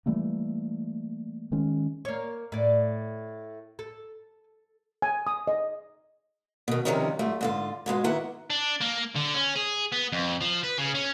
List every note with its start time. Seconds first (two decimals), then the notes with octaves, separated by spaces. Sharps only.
0.06 E3 G3 A3 A#3
1.52 D#3 G#3 C#4
2.05 A#3 C#5
2.52 A2 D5
3.79 A4
5.02 G#5
5.27 D#6
5.47 D#5
6.68 B2 D#3
6.85 C3 D#3 F3 G3 C#4 D#4
7.19 G#2 G3 A3 F4
7.41 G#2 D3 F4
7.86 G#2 B2 G#3 F4
8.04 D#3 A#3 B3 E4 F#5
8.50 D4
8.81 A#3
9.16 D3
9.34 C#4
9.56 G#4
9.92 B3
10.12 F2
10.41 F3
10.63 B4
10.78 C#3
10.95 C#4